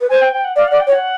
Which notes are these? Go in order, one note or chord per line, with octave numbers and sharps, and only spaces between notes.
B4
C5 G#5
G5
G5
F#5
D5 F5
D5 F#5
G5
C#5
F#5